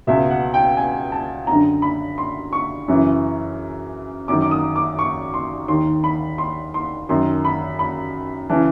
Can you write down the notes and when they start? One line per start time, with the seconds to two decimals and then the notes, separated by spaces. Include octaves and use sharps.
0.07 C#2 B2 E5
0.30 F#5
0.54 G5
0.77 G#5
1.12 A5
1.47 F#2 D3 A#5
1.82 B5
2.18 C6
2.53 C#6
2.88 F#2 C#3 E3
4.28 F#2 D#3 D6
4.42 D6
4.51 D#6
4.76 D6
4.99 C#6
5.34 C6
5.68 D#2 D#3 C6
6.04 B5
6.38 C6
6.74 C6
7.09 F#2 D#3 C6
7.45 B5
7.79 B5
8.50 C#3 E3 A5